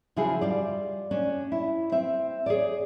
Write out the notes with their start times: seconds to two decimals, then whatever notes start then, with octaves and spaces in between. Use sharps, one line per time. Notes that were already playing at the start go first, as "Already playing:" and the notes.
0.16 C#3 F3 G#3 E4 F#4 G#4
0.41 G3 F4 D5
1.11 C#4 D4
1.52 E4
1.92 C4 E5
2.46 G#4 C#5 D5